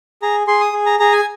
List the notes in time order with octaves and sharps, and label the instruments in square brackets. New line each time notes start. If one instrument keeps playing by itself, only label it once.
[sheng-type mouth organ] G#4 A#5
G#4 C6
D#6
G#4
A#5
G#4 A#5
G#5